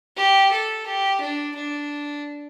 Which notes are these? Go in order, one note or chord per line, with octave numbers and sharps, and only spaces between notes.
G4
A4
G4
D4
D4